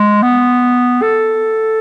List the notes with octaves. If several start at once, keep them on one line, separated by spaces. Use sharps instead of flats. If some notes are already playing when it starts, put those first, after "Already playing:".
Already playing: G#3
B3
A4